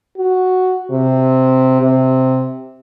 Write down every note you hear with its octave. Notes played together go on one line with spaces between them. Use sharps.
F#4
C3
C3